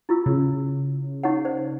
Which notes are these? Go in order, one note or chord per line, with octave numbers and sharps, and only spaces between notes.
E4 F4 E6
C#3
D#4 C#5 F#5
C5 D5